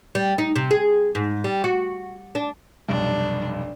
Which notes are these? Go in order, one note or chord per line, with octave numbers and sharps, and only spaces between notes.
G3
D#4
C3
G#4
G#2
G3
F#4
D4
F1 B1 G2 D4